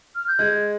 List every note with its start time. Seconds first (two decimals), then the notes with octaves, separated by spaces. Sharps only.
0.15 F6
0.27 G6
0.39 G#3 G#6